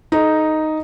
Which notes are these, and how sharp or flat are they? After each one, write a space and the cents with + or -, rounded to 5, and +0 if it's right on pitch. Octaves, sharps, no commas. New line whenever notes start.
D#4 +0 A4 -40